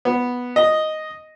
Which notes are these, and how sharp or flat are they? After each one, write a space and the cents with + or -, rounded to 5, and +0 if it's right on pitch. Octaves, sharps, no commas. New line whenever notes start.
B3 -5
D#5 +0